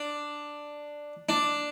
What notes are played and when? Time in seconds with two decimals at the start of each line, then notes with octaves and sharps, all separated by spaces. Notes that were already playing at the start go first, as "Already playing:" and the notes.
Already playing: D4
1.29 D4